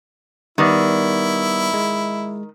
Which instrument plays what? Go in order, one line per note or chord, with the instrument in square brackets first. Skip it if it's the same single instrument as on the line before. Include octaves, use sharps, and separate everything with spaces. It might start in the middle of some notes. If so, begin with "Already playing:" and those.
[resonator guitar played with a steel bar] D#3 [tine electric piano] G3 B3 D5 [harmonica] E4
[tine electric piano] G#3